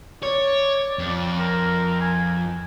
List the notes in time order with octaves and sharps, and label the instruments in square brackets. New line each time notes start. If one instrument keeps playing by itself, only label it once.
[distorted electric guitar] C#5 [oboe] D5
[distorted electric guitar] F2
[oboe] A#4
G#5